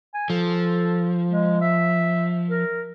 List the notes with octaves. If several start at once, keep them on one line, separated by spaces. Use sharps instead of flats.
G#5
F3 A4
G#3
E5
A#4